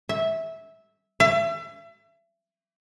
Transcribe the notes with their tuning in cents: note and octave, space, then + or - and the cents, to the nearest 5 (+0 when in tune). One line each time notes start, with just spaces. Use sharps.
E5 -15
E5 +35